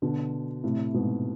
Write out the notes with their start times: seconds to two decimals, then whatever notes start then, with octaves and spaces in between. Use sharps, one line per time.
0.02 B2 D3
0.64 A2 C3
0.94 G#2 B2